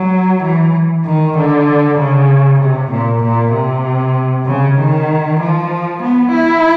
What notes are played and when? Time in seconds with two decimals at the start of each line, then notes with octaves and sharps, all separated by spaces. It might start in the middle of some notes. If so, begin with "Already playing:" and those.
Already playing: F#3
0.43 E3
1.06 D#3
1.37 D3
1.99 C#3
2.61 C3
2.91 A#2
3.23 A#2
3.54 C3
4.46 C#3
4.78 D#3
5.41 F3
6.02 B3
6.33 E4